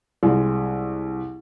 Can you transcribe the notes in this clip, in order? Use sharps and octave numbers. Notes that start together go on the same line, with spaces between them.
C2 G#3